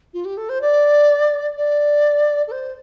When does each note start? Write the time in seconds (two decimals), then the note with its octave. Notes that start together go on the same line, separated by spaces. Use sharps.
0.13 F4
0.25 G4
0.37 A4
0.49 C5
0.61 D5
1.57 D5
2.47 A4
2.51 C5